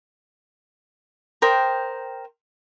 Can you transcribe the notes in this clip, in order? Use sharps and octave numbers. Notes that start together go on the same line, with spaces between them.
A#4 C5 G5 D#6